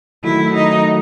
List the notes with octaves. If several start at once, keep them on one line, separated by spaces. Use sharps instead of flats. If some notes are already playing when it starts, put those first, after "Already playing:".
D#3 F#3 A3 E4
D#4